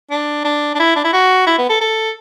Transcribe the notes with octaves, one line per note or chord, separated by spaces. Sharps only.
D4
D4
D4
E4
D4
E4
F#4
E4
B3
A4
A4